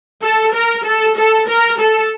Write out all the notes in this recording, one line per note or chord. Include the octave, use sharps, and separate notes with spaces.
A4
A#4
A4
A4
A#4
A4